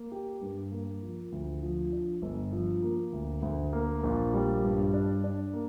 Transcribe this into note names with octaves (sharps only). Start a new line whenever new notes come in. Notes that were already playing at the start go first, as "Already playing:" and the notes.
Already playing: A#3
G4
G2
A#3
F3
D2
F3
D4
G1
F3
A#3
D2
D2
A#3
A#1
G3
G2
D4
D4
A#3